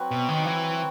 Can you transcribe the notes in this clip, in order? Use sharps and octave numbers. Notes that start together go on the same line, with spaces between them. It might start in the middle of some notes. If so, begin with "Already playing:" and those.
Already playing: F#3 C4 F#4 B4
B2
D#3
E3